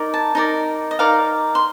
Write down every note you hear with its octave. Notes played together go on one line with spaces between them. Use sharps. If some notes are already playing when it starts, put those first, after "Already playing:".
Already playing: D#4 A#4 D5
A5
D#4 A#4 D5
D#5
D#4 A#4 D5 F5
C6